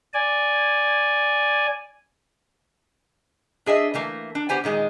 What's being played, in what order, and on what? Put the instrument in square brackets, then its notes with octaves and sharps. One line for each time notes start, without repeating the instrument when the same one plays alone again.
[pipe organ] D5 G#5
[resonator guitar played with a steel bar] D4 G#4 D#5 E5
E3 A3 A#3
D4
B3 G4 C5 G#5
A#2 D#3 G#3